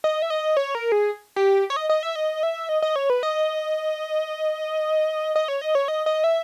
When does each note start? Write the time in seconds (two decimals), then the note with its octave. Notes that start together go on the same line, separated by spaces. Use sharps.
0.04 D#5
0.22 E5
0.30 D#5
0.57 C#5
0.75 A#4
0.92 G#4
1.36 G4
1.70 C#5
1.76 D#5
1.89 D#5
2.03 E5
2.16 D#5
2.43 E5
2.69 D#5
2.82 D#5
2.96 C#5
3.10 B4
3.23 D#5
5.36 D#5
5.48 C#5
5.61 D#5
5.75 C#5
5.88 D#5
6.06 D#5
6.24 E5